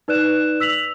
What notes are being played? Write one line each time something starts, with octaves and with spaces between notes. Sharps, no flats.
D#4 B4 D5 F#6 E7
E6 B6 F7 F#7